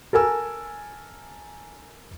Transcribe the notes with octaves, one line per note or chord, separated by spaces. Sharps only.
A4 A#4 G#5 E6